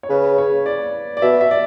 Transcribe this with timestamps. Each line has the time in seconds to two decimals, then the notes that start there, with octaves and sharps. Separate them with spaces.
0.03 C#5
0.10 C#3 B4
0.38 C#5
0.66 D5
1.17 D5
1.22 B2 E5
1.41 E5
1.51 D5